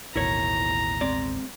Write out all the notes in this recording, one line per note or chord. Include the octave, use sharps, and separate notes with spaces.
A1 D#2 B2 E4 A#4 C#5 A#5
G#3 C4 D5